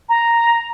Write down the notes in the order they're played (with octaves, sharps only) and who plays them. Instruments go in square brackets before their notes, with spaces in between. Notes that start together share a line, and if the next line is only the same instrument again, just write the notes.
[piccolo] A#5